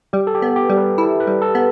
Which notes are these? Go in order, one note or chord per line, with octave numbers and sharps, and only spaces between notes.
G3 G4
A4
G4
B3
G4
G3
B4
E4 A4
B4
G3
A4
B3